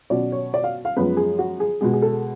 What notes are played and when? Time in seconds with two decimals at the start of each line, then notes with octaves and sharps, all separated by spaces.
0.10 B2 F#3 C#4 D5
0.32 C#5
0.54 D5
0.64 F5
0.85 F5
0.96 F#2 F3 G#3 B3 B4
1.17 G#4
1.39 F#4
1.60 G#4
1.81 B2 G#3 B3 G#4
1.93 G#4
2.02 A4